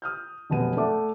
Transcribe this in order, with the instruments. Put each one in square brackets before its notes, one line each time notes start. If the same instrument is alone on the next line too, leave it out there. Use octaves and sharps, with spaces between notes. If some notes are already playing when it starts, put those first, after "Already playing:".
[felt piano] D#6 F6 G6
F1 F#2 B2 B3 D#7
A3 D5 E5 F#5 D6